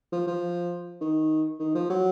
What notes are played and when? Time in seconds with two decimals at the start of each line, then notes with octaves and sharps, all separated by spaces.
0.13 F3
0.27 F3
1.01 D#3
1.60 D#3
1.75 F3
1.90 F#3